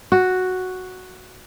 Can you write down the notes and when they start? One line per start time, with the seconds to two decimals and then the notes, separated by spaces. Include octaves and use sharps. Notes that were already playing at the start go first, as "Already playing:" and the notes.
0.12 F#4